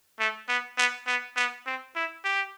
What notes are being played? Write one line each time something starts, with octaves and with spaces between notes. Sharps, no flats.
A3
B3
B3
B3
B3
C4
E4
G4